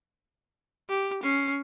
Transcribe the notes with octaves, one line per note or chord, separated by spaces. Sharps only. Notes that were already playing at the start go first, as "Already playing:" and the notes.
G4
C#4 C7